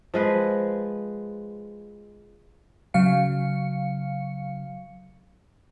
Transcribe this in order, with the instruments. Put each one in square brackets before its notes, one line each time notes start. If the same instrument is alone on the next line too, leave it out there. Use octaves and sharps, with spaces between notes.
[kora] F3 G#3 B4
[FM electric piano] C#3 F#3 F5 C#7